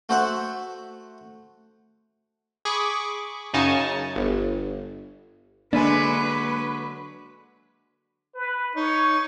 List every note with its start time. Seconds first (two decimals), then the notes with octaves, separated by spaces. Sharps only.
0.09 A3 F#4 C5 E5 F#5
2.65 G#4 B5 C#6 D6
3.54 F#2 C#3 D#4 G#5 A5 C#6
4.16 G1
5.73 D3 F#3 G#3 A#3 D4 B4 E5 G#5
8.35 B4
8.75 D#4 C#5